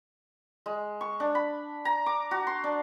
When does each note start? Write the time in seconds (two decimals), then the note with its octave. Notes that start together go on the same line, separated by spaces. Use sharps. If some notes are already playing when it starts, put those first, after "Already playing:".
0.66 G#3
1.01 C#6
1.20 D4
1.35 B5
1.85 A#5
2.06 D6
2.31 F#4
2.47 C6
2.64 D4